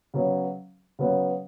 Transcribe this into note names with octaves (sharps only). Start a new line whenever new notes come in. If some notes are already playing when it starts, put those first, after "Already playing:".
C#3 F#3 B3
C#3 F#3 B3